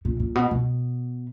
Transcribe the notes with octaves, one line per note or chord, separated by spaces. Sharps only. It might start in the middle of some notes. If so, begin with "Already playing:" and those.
A#2
A#2
B2
B2